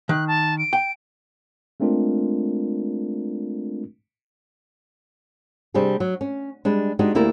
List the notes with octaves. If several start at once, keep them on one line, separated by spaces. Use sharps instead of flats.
D#3 F#6
A5
D7
G5
G#3 A3 C4 D4 F4 A#4
C3 G3 C4 D4 G#4
F#3
C#4
G3 G#3 D4
G#3 D4 D#4 F#4 G4
D2 A#3 E4 G4 A#4 D5